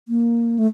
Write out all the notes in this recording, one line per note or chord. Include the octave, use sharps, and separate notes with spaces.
A#3
A3